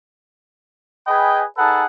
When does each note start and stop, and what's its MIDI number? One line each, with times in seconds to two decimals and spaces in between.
1.07 1.43 68
1.07 1.43 71
1.07 1.43 75
1.07 1.43 79
1.07 1.43 80
1.07 1.43 83
1.57 1.85 63
1.57 1.85 68
1.57 1.85 69
1.57 1.85 71
1.57 1.85 78
1.57 1.85 81